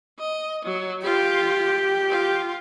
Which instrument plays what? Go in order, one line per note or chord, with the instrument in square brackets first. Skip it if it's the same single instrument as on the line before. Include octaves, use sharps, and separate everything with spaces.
[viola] D#5
F#3
[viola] F4 [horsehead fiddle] G4
[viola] F4